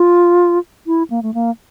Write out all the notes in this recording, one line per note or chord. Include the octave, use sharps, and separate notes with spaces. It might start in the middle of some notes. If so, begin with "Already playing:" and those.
Already playing: F4
E4
A#3
A3
A#3